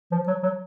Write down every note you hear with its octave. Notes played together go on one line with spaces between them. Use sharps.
F3
F#3
F#3